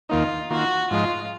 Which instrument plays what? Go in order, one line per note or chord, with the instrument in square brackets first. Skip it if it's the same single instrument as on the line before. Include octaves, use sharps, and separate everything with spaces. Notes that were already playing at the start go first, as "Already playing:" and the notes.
[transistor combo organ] D#2 D#3 A#3 D#4 [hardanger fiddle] F4
[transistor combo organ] D#3 A#3 F4 [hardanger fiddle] F#4
[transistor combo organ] G#2 F3 G#3 D#4 [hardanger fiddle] F4